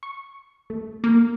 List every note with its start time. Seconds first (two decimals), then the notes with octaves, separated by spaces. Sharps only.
0.03 C#6
0.70 A3
1.04 A#3